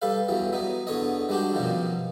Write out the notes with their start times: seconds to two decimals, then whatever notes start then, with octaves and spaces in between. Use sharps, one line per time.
0.02 G3 A4 B4 F5
0.28 E2 E3 F#3 G3
0.53 F#3 B3 D#4
0.87 E2 D3 B3 C#5 D#5
1.29 G3 G#3 D4 F#4 G4
1.54 F#2 B2 D#3 F3 F#3